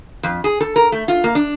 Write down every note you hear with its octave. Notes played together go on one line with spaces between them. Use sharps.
F2
G#4
A4
A#4
A3
F4
A#3
D4